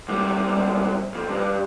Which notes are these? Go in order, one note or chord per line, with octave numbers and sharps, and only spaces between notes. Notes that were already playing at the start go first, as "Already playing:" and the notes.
B1 G3
F2
G2